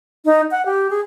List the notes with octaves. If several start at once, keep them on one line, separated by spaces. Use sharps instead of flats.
D#4
F#5
G4
G#4